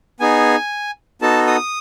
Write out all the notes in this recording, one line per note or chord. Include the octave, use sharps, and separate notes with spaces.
B3 D#4 G#4 G#5
B3 D#4 F#4 A4 A5
D#6